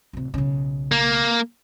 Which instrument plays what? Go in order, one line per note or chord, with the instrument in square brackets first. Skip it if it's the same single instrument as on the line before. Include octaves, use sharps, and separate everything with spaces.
[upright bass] D1 C3
B1 C#3
[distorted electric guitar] A#3